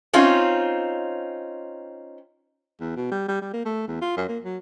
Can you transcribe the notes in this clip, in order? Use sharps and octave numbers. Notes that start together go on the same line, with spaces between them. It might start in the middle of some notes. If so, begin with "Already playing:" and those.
C4 C#4 D#4 F4
E2
B2
G3
G3
G3
A#3
A3
E2
F4
F#2
A#3
F#3